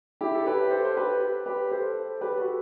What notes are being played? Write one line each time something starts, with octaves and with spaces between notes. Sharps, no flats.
E4 G4
A4
G4 B4
A4 C5
C5
G4 B4
G4 B4
A4 C5
G4 B4
F#4 A4